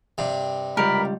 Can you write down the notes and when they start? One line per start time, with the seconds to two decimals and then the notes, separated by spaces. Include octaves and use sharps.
0.18 G2 C3
0.77 C#2 G3 A#4 B5